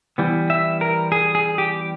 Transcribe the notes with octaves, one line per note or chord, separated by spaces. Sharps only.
E3 G3 B3
E5
A#4
G#4
G#4
G4